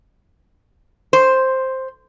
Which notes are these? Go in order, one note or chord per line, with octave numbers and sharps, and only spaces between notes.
C5